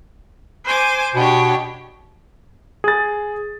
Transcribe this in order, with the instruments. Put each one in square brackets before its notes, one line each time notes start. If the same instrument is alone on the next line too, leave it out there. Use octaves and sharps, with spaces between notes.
[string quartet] C5 G#5 D6
[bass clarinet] B2 [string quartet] D4 G4 C#5
[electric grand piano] G#4 A6